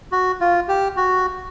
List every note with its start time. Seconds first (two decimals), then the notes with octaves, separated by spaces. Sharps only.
0.12 F#4
0.40 F4
0.68 G4
0.97 F#4